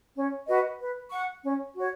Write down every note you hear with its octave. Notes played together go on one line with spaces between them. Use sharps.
C#4
F#4 B4 D#5
B4
F#5 C#6
C#4
F#4 C#5